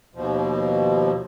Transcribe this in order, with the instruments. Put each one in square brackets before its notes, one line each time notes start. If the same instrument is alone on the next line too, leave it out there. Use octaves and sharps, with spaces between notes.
[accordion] D#2 B2 F3